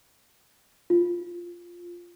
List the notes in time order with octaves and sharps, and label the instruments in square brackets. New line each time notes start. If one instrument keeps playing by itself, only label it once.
[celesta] F4